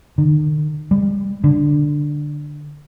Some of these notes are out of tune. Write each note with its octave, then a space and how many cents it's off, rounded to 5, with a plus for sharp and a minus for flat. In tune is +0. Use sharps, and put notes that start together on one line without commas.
D#3 -45
G3 +35
D3 +5